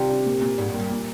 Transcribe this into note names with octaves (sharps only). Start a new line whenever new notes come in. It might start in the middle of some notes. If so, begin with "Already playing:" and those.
Already playing: C3 D#3 G3 F4
D4
A#2
A#2
G#2 G3
G2
A#3
G2
A#2